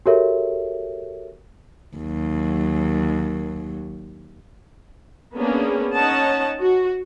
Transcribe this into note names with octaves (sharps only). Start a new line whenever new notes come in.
F#4 G4 A4 A#4 C#5 E5
D#2 F#3
A#3 B3 C#4 D4 G#4
C#4 D#4 C#5 D#5 F#5 A5
F#4